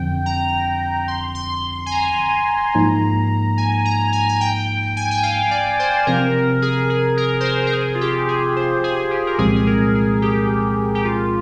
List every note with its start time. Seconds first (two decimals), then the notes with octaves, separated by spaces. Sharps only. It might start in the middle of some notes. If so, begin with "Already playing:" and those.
Already playing: F2 D3 F3 C4 G5
0.26 A#5
1.08 C6
1.35 C6
1.86 G#5
1.91 A#5
2.75 G#2 F3 A#3 D#4
3.58 G#5
3.85 A#5
4.13 G#5
4.29 G#5
4.41 G5
4.97 G#5
5.11 G5
5.23 F5
5.51 D5
5.79 C5
6.07 C3 F3 C4 A#4
6.62 G#4
6.90 G#4
7.17 A#4
7.40 C5
7.45 A#4
7.67 A#4
7.73 G#4
7.95 F4
8.01 G4
8.29 G#4
8.56 C5
8.84 G#4
9.11 G4
9.27 A#4
9.38 C2 A#2 F3 G#3 C4 G#4
9.56 G#4
9.67 A#4
9.95 G#4
10.22 G4
10.95 G4
11.05 F4